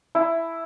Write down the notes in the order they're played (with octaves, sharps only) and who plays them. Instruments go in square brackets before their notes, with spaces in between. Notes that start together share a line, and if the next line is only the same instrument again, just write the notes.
[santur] E4